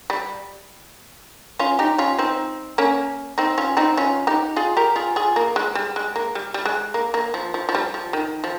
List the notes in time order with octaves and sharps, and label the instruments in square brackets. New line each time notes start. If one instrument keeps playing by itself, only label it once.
[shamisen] G3
C#4 F4
D#4 G4
C#4 F4
C4 D#4
A#3 C#4
C4 D#4
C#4 F4
C4 D#4
C#4 F4
D#4 G4
F4 G#4
G4 A#4
F4 G#4
F4 G#4
A#3
G#3
G3
G#3
A#3
G3
G3
G#3
A#3
A#3
F3
F3
F3
G3
F3
D#3
F3